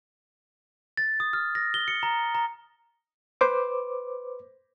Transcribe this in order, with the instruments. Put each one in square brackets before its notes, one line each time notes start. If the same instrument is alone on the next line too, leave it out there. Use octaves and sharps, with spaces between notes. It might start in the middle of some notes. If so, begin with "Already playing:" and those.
[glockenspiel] A6
D#6
F6
A#6
G7
C#7
A#5
A#5
[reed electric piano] B4 C5 D6